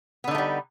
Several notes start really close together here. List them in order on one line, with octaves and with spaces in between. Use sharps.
B3 D3 D#4 A3 G3